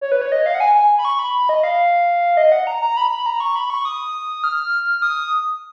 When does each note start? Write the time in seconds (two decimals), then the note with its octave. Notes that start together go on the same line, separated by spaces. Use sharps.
0.01 C#5
0.12 B4
0.21 C#5
0.32 D#5
0.46 F5
0.55 F#5
0.60 G#5
0.75 G#5
0.98 B5
1.05 C#6
1.19 B5
1.49 D#5
1.63 F5
2.37 D#5
2.52 F#5
2.67 A#5
2.82 A#5
2.97 B5
3.11 B5
3.26 A#5
3.40 C#6
3.56 B5
3.70 C#6
3.85 D#6
4.44 F6
5.02 D#6